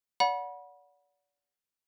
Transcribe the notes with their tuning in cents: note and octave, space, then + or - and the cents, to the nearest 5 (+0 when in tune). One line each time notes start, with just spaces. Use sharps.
D5 -40 F#5 -20 B5 -30